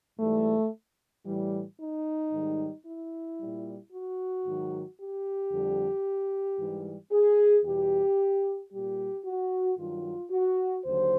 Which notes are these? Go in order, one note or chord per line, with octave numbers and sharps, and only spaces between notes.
G#2 E3 G3 A3
A2 E3 G3
D#4
G#2 D#3 G3
E4
A#2 G3
F#4
G#2 D#3 F#3
G4
F2 D3 G3
G#2 E3 G3
G#4
E2 B2 G3 G4
A#2 G3 G4
F#4
G2 D#3 F#3 F4
F#4
D#2 D3 F#3 C5